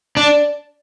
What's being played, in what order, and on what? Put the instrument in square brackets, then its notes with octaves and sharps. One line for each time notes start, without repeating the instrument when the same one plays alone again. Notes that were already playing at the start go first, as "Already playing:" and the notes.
[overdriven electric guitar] D4 [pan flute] D5